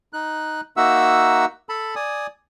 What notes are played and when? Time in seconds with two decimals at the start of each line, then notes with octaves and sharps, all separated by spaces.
0.13 D#4 F#6
0.77 A#3 D#4 F#4 E5 F#5 E6
1.69 A4 A5 B5
1.95 D5 G#5 D#6